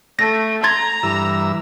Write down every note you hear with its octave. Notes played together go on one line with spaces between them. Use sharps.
A3 A#6
A#5 C6 G#6 A6
G2 E3 E6